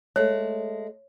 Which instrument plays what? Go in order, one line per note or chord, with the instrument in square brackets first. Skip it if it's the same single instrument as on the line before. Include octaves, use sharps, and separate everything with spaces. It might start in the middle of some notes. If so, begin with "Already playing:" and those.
[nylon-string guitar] G#3 A3 [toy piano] C#5